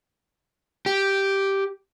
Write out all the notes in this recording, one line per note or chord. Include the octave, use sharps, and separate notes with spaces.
G4